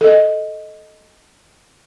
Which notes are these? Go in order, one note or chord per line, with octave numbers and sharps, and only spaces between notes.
A4 D#5